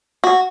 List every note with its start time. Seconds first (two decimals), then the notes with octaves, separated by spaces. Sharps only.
0.24 F#4